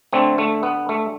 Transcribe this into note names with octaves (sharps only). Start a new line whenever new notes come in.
D3 A3 C4
A3
B3
A3